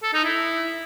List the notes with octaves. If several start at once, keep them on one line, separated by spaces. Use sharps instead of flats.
A4
D#4
E4